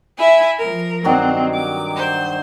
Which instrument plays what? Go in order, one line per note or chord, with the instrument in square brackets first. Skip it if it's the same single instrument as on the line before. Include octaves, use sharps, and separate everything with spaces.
[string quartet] E4 E5 G#5
F3 A#4
[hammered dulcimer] G2 D#3 F#3 [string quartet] C4
[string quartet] D6
C5